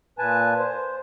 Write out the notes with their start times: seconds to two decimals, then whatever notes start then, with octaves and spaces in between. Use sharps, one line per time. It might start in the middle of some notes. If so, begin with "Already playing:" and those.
0.19 A#2 B4 G#5 A5
0.59 C5